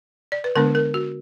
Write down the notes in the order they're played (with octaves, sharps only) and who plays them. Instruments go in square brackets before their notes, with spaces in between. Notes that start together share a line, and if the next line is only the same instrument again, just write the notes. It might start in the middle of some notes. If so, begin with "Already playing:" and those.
[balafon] D5
B4
D3 G#3 B3 D4 A#4
A#4
F#4